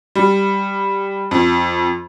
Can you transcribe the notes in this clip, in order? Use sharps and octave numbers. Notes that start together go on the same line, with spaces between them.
G3
F2